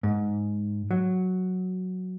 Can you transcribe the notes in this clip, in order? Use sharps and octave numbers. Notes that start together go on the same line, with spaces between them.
G#2
F#3